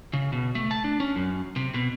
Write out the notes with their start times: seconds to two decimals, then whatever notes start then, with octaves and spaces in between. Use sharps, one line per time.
0.13 C#3
0.32 B2
0.55 A3
0.71 A5
0.84 D4
1.00 C#4
1.16 F#2
1.56 C3
1.74 B2